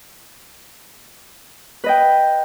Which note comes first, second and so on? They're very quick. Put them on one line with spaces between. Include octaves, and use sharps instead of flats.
B4 D#5 G5